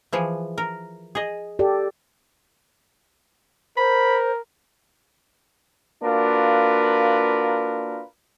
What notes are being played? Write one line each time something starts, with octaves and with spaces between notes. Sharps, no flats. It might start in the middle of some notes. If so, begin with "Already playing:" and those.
E3 F3 G#4
A#4
G#4 D#5
G4 A4 D5
A#4 C5 B5
A#3 D4 F4 F#4 A#4 B4